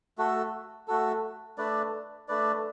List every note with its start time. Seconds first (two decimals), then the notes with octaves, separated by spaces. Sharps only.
0.18 A3 F#4 A4
0.88 A3 F#4 A4
1.58 A3 D4 B4 D5
2.28 A3 D4 B4 D5